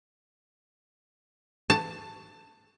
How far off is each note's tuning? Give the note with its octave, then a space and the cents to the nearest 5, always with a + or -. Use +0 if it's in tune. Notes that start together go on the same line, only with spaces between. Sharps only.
A5 +20